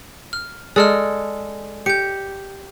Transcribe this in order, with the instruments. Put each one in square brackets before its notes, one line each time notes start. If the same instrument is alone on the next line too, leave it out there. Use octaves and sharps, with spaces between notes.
[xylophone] F6
[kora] G#3 A4 [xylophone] D5 D#5 F6
[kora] G4 [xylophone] G6 C#7